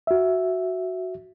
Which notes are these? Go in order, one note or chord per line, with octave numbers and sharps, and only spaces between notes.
F#4 E5